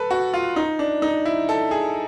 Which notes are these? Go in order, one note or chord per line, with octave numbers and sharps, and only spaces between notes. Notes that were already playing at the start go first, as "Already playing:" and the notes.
Already playing: A4 B4
F#4
F4
D#4
D4
D#4
E4
A4
G#4